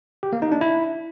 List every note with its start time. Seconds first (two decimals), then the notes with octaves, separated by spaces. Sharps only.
0.23 G4
0.33 A#3
0.42 D#4
0.52 D4
0.61 E4